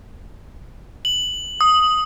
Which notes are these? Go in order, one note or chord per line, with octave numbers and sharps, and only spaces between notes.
F#7
D#6